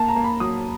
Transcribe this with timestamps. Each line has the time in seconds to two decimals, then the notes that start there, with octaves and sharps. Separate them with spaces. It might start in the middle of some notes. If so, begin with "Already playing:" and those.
Already playing: A#3 A5
0.08 A#5
0.16 A#3
0.24 B5
0.40 F#3 D#6